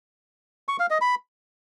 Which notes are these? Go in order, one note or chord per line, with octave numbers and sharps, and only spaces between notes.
C#6
F5
D#5
B5